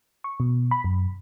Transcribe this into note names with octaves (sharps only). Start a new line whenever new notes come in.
C#6
B2
B5
F#2